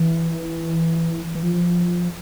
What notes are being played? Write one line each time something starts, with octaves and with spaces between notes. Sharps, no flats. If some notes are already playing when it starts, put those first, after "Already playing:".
Already playing: E3
E3
F3